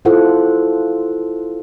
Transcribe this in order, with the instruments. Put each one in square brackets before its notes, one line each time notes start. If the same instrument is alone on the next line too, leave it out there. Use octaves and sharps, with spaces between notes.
[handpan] E4 F4 A4 C5 F#5